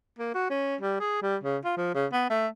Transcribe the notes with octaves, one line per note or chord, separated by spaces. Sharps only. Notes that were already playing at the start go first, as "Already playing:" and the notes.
A#3
F#4
C#4
G3
G#4
G3
C#3
F4
F3
C#3
B3
A3